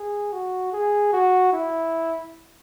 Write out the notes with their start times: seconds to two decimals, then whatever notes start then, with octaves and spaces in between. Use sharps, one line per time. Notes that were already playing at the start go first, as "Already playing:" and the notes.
Already playing: G#4
0.32 F#4
0.73 G#4
1.13 F#4
1.53 E4